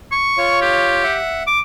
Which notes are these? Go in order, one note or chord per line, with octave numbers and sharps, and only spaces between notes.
C#6
F4 C#5
G4
E5 F#5
D6